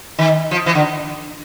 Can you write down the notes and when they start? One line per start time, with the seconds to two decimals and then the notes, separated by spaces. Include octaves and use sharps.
0.19 D#3
0.51 F3
0.66 E3
0.75 D3